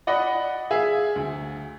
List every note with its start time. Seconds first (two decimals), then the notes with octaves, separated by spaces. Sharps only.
0.07 D5 D#5 F#5 B5
0.71 G#4 E5 F5
1.16 D2